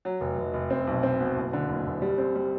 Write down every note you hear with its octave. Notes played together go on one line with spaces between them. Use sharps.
F#3
F1
F1
F1
C4
B1
C4
B2
F#1
D3
F#1
F#1
G3
C4
G3